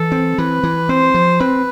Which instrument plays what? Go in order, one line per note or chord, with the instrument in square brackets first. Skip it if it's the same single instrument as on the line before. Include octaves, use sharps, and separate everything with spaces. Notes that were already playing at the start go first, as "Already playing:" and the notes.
Already playing: [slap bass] E3 [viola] A4
[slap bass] C4
[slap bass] E3 [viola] B4
[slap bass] E3
[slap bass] C4 [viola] C5
[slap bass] F3
[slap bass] C4 [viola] B4